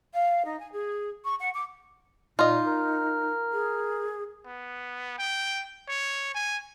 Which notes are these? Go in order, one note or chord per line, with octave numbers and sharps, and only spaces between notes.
F5
D#4
G#5
G#4
C#6
F#5
D6
A#2 D#4 F4 D#5
A#4
G#4
B3
G5
C#5
G#5